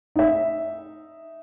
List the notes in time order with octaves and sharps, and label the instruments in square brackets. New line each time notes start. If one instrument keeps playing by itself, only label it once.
[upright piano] D#4 E5